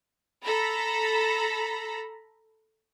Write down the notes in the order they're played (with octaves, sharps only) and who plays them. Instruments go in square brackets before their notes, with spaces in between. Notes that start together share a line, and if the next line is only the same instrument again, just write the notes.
[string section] A4 A#5 B5